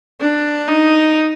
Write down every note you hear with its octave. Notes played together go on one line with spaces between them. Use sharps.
D4
D#4